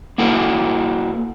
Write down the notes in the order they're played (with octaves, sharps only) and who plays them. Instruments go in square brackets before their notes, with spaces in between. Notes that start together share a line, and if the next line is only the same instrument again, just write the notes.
[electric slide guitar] A#3 E4 F#4 A4 B4